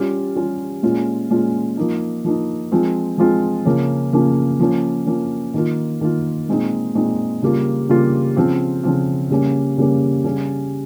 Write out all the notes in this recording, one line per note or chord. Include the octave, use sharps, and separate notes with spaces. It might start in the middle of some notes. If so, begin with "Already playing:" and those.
Already playing: G3 C#4 F4
G3 C#4 F4
A#2 G#3 C#4 F4
A#2 G#3 C#4 F4
F3 A#3 D#4
F3 A#3 D#4
F3 G#3 C4 F4
F3 G#3 C4 F4
C#3 F3 A#3 C#4
C#3 F3 A#3 C#4
F3 A#3 C#4
F3 A#3 C#4
D#3 A#3 F4
D#3 A#3 F4
A#2 G#3 C4 D#4
A#2 G#3 C4 D#4
C#3 G3 A#3 F4
C#3 G3 A#3 F4
C#3 F3 C4 F4
C#3 F3 C4 F4
C#3 G3 A#3 C#4
C#3 G3 A#3 C#4
C#3 G3 C#4